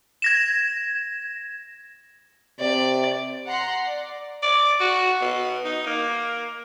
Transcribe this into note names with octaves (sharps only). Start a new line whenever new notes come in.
G#6 A#6 E7
C3 D5
F#5 A#5 C6
D5
D5
F#4
B2
D#4
A#3